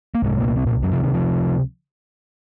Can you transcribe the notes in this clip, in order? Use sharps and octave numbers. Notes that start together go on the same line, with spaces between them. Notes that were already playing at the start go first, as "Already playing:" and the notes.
A#3
C2 G#2 C3 G#3
A#2 A#3
C3 C4
A#2 A#3
F#2 F#3
C#2 C3 F3
D#3
F3